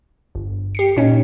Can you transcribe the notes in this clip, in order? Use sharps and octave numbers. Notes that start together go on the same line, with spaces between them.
G1
G4 C7 C#7
A#2 C#4 D#4